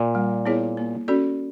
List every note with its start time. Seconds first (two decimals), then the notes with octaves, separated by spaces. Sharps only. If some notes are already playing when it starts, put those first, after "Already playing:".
Already playing: A#2
0.15 G3
0.46 B3 E4 G#4 C#5
0.77 A#3
1.08 C#4 F#4 A4 D5